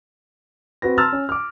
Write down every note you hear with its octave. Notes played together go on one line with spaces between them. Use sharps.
C4 F#4 B4 A#6
A5 A#5 C6 E6 F6 A6
C#4
D6 F6